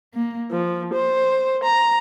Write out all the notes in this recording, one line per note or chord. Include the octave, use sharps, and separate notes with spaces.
A#3
F3
C5
A#5